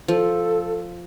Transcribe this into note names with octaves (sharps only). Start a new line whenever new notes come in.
F3 A4